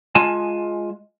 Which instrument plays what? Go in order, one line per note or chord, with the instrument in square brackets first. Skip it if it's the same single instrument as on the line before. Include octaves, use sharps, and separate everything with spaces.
[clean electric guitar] G#3 F4 G#5 A5